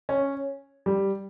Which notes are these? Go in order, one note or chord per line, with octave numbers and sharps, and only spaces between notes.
C#4
G3